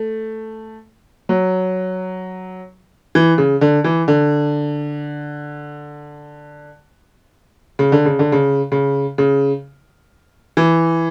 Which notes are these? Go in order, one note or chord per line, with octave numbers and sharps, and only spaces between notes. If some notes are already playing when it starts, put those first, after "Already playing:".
Already playing: A3
F#3
E3
C#3
D3
E3
D3
C#3
D3
C#3
D3
C#3
C#3
C#3
E3